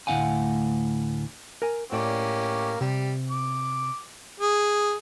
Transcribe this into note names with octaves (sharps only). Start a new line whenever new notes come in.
D2 A2 C4 F5 F#5 G#5
A#4 G#5
A2 A#3 C#4 G4 D5
C3 G3
D6
G#4